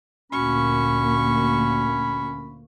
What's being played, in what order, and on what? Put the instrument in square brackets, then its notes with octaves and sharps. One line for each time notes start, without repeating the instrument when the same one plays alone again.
[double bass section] D2 A#2 A#3 [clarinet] C#4 [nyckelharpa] F#4 C#6 [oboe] B5